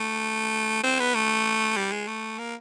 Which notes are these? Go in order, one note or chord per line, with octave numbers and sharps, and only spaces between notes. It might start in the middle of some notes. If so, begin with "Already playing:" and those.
Already playing: A3
C4
B3
A3
G3
G#3
A3
A#3